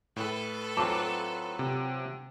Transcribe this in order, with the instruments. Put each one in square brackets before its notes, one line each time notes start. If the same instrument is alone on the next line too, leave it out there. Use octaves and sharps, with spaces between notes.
[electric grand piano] A2 [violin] A4 B4
[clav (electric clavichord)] F#3 C4 F4 [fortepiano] A5 D6
[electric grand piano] C3